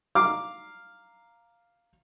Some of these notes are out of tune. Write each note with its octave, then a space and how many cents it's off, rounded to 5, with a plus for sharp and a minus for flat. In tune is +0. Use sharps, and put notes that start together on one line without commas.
F5 +0 A#5 +0 D6 +0